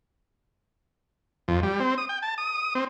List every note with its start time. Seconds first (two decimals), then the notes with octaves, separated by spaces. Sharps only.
1.48 F2
1.63 G3
1.80 C4
1.98 D#6
2.09 G5
2.22 A5
2.38 D#6
2.75 C4